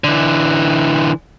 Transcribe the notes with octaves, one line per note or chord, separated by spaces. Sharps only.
D3 E3